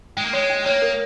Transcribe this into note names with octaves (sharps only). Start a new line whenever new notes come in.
G#3 G5
A#3
G#3 C#5
G5
A#3 C#5
A#4